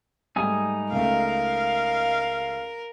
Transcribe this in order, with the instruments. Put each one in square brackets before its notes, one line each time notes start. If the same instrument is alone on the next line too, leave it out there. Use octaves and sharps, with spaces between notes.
[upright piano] G#2 G3 A3 [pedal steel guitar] D#4 G#5 D#6
[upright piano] C#2 A3 [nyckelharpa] A#4 [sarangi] F5
[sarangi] F5